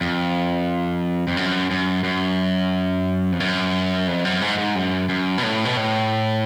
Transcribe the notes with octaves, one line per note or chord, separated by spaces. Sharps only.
F2
F2
F#2
F#2
F#2
F2
F#2
F2
F#2
G#2
G#2
F#2
F#2
B2
A2
B2
A2